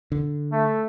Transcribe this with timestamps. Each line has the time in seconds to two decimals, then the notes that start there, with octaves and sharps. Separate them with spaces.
0.12 D3
0.52 A3